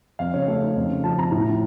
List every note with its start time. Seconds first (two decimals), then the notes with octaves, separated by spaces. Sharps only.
0.19 F2 F5
0.34 C#3 C#5
0.48 A3 F5
0.62 D#4
0.76 F2
0.91 C#3
1.04 F3 A5
1.18 F2 A#5
1.32 A2
1.47 F3